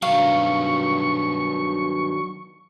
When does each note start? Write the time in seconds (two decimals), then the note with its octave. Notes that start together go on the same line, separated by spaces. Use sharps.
0.02 G2 D#3 F#3 F5 C#6